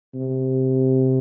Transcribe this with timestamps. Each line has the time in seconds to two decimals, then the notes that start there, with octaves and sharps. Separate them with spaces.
0.15 C3